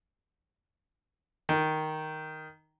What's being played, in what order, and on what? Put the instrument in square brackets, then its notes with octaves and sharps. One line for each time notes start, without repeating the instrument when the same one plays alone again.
[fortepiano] D#3